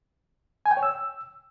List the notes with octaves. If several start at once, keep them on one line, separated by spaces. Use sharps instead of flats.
G#5
G5
C#5
E6